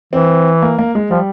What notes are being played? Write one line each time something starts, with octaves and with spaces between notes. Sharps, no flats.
E3 C4
A#3
A#3
G#3
F3 G3